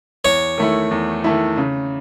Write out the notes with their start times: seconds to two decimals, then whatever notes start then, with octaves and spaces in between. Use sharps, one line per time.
0.25 E2 C#5
0.58 D#3 A3 E4
0.91 E2
1.24 D#3 A3 E4
1.57 C#3